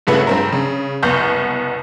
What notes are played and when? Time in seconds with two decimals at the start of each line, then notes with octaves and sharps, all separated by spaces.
0.07 G2 A#2 C#3 A3 B4 F#5
0.27 G2 C4 A#4
0.52 C#3
1.03 F#1 C2 B3 C#6 F6 G6